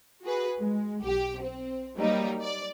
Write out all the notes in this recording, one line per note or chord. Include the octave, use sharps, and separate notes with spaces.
F#4 G#4 B4
G#3
B1 G4
C4
F#3 G3 A#3 D#4
D5